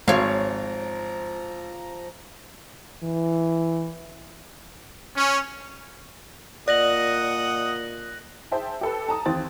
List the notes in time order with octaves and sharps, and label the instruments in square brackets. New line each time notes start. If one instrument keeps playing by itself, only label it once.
[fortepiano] G#1 [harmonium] F3 A#5 [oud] C#5 F5
[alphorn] E3
[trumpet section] C#4
[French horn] A#2 [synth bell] D5 [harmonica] D#5 F#5 [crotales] F#6 A#6 F#7
[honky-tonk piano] G#4 C5 E5 G5 A5
G4 A4 B4
A5 A#5 D#6
D#2 E3 C4 A6